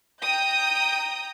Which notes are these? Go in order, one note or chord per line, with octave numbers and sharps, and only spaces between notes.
G5 A#5 D#6 G6